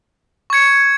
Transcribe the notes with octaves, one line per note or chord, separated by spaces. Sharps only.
C#6 G#6 C#7